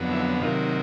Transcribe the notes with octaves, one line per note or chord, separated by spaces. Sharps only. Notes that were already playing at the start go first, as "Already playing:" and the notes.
Already playing: F2 D3 F#3 B3
E4
C3 D#3 F#3 A#3 F4